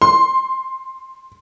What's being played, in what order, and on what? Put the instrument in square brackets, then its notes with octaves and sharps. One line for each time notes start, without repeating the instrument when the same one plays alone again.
[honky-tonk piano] C6